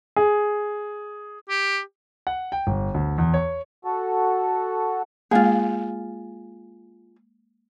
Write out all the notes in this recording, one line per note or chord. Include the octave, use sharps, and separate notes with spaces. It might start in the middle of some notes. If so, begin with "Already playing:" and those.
G#4
G4
F#5
G5
G1
D2
E2
C#5
F#4 A4
G#3 A#3 F4 G#4